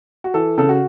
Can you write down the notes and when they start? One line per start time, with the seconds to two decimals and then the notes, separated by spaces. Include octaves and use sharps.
0.24 F#4
0.34 E3 A4
0.58 C#3 A4
0.69 F#4